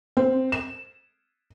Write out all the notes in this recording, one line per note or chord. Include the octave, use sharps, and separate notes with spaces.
C4
E7